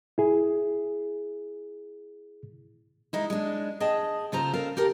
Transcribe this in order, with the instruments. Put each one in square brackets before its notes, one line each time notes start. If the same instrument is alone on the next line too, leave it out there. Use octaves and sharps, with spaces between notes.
[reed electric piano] E4 G#4
[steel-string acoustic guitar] G#3 D#4 E4
G#3 D4
G#4 D#5 G5 A5
C#3 F4 A4 C5 A#5
C#3 A4 A#4 F5
G4 A4 A#4